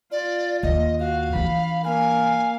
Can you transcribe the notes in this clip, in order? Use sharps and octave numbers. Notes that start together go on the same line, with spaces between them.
F4 D5
D#2 D#5
F#4 F5
E3 D4 B5
A#3 F5 G#5